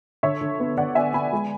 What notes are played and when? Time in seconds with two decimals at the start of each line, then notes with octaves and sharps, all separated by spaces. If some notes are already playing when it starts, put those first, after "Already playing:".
0.23 D3 C#5 E5
0.41 D3
0.60 B3
0.77 D3 D5 F#5
0.95 B3 E5 G#5
1.14 B3 G#5 B5
1.33 G#3